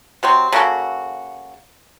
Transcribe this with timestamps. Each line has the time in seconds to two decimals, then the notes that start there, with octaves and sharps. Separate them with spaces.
0.23 C3 F#3 C4
0.52 C#3 A#3 F#4 A4